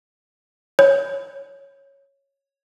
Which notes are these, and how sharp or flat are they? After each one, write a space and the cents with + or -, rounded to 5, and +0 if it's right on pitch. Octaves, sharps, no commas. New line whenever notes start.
C#5 -5